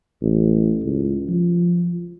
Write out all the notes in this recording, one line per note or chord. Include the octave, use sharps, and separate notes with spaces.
A1
C#2
F3